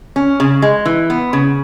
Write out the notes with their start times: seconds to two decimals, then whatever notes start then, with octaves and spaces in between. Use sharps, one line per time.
0.16 C#4
0.40 C#3
0.62 G#3
0.85 E3
1.10 B3
1.33 C#3